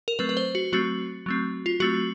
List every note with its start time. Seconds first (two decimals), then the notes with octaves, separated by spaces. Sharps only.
0.08 A#4
0.19 F#3 A3 C4 B4
0.29 B4
0.37 C5
0.55 F#4
0.73 F#3 A3 C4 F#4
1.26 F#3 A3 C4
1.66 F4
1.80 F#3 A3 C4 F#4